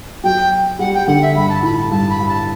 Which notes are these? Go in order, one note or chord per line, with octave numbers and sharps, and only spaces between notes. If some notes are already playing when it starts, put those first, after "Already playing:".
F#3 G5
G3 F#5
G5
D3 F#5
E5
G2 B5
A5
A2 B5
A5
G2 A5
B5
G2
A5